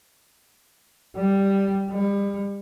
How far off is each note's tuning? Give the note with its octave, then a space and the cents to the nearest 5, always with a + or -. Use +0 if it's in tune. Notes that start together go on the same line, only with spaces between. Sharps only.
G3 +0
G3 +35